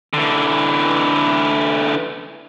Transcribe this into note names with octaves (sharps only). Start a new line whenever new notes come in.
D3 E3